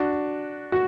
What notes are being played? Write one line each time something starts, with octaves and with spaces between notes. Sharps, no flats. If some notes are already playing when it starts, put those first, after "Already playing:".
Already playing: D4 F#4
F#4